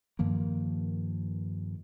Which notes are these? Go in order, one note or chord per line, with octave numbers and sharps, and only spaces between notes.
G2 D#3 F3 A#3